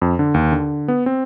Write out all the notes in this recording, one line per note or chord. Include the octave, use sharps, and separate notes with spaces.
F2
D3
D#2
D3
B3
C4